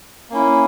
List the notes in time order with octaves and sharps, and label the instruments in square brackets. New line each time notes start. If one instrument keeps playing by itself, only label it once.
[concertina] A#3 C#4 E4